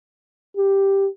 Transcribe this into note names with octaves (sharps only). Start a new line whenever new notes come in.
G4